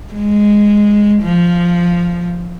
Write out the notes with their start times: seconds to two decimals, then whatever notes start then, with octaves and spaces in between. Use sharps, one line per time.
0.14 G#3
1.22 F3